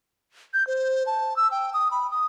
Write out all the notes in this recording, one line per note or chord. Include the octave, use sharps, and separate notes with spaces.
G6
C5
A5
E6
G5
D#6
B5
D#6